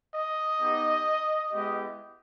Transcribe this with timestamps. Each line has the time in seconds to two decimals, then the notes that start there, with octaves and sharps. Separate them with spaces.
0.15 D#5
0.61 B3 D#4 G4
1.53 G#3 B3 E4 G4